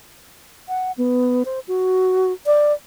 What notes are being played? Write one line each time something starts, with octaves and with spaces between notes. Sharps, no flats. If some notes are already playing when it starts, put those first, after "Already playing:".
F#5
B3
C5
F#4
D5